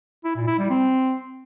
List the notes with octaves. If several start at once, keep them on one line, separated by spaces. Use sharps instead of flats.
E4
A#2
E4
G3
C4